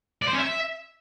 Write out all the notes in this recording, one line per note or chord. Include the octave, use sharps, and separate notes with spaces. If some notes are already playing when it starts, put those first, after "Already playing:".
D5
C5
C#4
E5